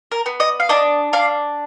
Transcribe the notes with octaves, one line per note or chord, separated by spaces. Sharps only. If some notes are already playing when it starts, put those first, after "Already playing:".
A#4
B3
D#5
F5
D4 D#5
D4 F5